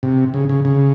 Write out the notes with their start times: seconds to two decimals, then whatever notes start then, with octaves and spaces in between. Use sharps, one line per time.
0.03 C3
0.34 C#3
0.49 C#3
0.65 C#3